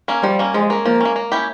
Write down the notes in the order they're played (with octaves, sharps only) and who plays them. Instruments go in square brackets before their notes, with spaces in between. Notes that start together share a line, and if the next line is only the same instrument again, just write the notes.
[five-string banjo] A#3 C#4
[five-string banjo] F3 [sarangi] G3
[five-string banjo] A#3 C#4
[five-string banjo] F3 [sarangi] G#3
[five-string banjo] A#3 C#4
[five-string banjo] F3 [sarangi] A#3
[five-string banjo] A#3 C#4
A#3
C#4 E4 G4